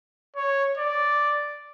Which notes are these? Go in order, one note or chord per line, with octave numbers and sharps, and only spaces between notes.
C#5
D5